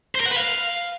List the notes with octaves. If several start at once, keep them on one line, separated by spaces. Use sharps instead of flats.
C5
A#4
F#5
B4
F5